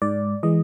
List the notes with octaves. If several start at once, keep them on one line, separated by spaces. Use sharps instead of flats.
G#2 D5
E3 G#3 D#5